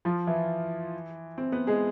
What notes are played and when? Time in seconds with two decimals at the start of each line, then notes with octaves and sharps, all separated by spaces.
0.05 F3 F4
0.27 E3 E4
1.38 C4
1.52 B3 B4
1.67 G#3 G#4